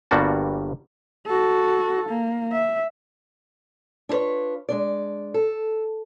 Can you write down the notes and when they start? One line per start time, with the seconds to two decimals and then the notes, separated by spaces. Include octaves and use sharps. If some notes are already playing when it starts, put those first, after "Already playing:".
0.11 G1 G2 G3 A#3 F#4 A5
1.26 F#4 A4
2.10 A#3
2.52 E5
4.09 D4 E4 F4 B4 C#5
4.69 G#3 D4 D5
5.34 A4